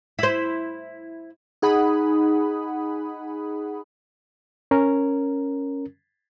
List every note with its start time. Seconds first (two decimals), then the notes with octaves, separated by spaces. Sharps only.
0.19 E4 C5
1.62 D#4 G#4 F#5 B5 D#6
4.71 C#4 A#4